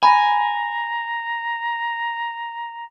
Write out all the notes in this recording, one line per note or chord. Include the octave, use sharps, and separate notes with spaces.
G#5 A#5 B5